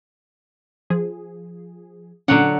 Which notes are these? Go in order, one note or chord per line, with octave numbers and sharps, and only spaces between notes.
F3 G#4
A#2 D3 F#3 C#4 F#5